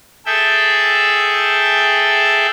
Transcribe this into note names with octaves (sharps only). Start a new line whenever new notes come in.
G#4 A4 E5 G5